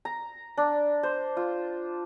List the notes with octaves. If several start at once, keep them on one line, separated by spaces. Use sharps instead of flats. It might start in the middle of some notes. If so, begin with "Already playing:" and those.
A#5
D4
C5
F4